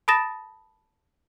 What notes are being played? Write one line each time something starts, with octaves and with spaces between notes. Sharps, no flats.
A5 B5 D#6 A6 A#6 E7